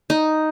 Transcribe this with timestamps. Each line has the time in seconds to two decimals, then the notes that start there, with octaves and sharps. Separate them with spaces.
0.10 D#4